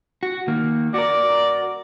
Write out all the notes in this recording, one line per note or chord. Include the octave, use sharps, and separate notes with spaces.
F#4
D#3 A#3
F#4 A#4 D5